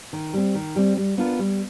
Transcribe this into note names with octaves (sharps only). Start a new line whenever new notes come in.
D#3
G3 C4
D#3
G3 C4
G3
B3 D4 F4 A#4
G3